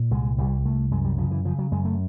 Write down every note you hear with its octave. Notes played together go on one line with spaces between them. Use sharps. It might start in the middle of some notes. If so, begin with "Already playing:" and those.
Already playing: A#2
C2 G#3
C2 G3
C2 A3
F#2 G#3
G3
C#3 F3
E3
C#3 F3
F#3
F#2 G#3
A3